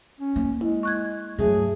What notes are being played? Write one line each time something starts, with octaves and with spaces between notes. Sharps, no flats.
C#4
A#3
G#3 E4
C#6 F#6 G#6
G2 F#3 A3 G#4